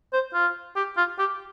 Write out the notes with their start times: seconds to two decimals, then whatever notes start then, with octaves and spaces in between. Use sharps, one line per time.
0.13 C5
0.34 F4
0.76 G4
0.97 F4
1.19 G4